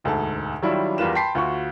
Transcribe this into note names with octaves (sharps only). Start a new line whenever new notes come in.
E1 D2 G#2 G#4 A4 A5
D#3 F#3 G3 D4 E4 F4
E2 G3 F4 A#4 B4 E7
G5 A5 B5 C6 B6 C7
D2 F4 F#4 C#6